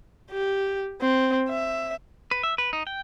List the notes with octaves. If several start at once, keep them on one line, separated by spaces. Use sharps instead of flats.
G4
C4
E5
B4
E5
B4
D#4
G5